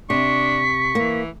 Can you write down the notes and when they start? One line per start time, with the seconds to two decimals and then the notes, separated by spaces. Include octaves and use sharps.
0.10 C3 D4 C#6 B6
0.95 E3 A#3